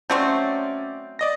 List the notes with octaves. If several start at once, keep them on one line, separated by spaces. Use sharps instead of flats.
F#3 A3 C4 C#4 D5 G6
D5 D#5 A#6